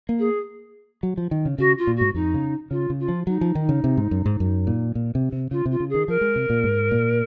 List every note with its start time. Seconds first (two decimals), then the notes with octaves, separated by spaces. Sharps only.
0.09 A#3
0.19 G#4
1.03 F#3
1.17 F3
1.31 D#3
1.46 C#3
1.58 C#3 F#4
1.78 F4
1.87 A#2
1.96 G#2 F#4
2.15 F2 D#4
2.34 C#3
2.71 C#3 F4
2.90 C#3
3.00 F4
3.08 F3
3.27 F#3 D#4
3.41 F3
3.55 D#3
3.69 C#3
3.84 C3
3.97 G#2
4.11 F#2
4.26 G#2
4.40 F#2
4.67 A#2
4.95 A#2
5.15 C3
5.32 C3
5.51 C#3 F4
5.66 C3
5.71 F4
5.80 C#3
5.89 G#4
5.94 D#3
6.08 F3 A#4
6.21 G#3
6.36 C3
6.50 A#2
6.64 G#2
6.91 A#2